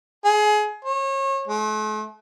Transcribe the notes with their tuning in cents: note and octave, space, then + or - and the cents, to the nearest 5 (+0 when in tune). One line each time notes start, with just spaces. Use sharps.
G#4 +25
C#5 -35
A3 -45